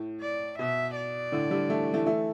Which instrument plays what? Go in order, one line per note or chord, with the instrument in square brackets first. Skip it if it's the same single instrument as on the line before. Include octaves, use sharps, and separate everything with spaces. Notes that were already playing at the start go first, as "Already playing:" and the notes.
Already playing: [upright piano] A2
[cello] D5
[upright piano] B2 [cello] E5
[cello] D5
[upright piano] A2 D3
D3 G3
E3 A3
E3 A3
E3 A3